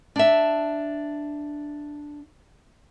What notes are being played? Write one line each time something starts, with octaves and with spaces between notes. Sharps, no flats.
D4 E5